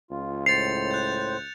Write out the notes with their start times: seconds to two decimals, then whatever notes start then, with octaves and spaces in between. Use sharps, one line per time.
0.11 C#2 F4
0.46 A2 C5 A6 C7 C#7 F7
0.91 F#6 G6